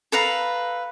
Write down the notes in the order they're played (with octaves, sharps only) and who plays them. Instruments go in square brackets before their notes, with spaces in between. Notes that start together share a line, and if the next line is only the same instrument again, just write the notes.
[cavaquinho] A4 B4 F5 A#5